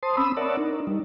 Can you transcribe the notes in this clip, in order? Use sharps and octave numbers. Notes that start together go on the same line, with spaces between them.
C5 A5 C6 D#6
C4 C#4 B5 D#6 E6
A#4 C#5 D5 E5 F#5 A5
D4 D#4 A#4
G3 D#4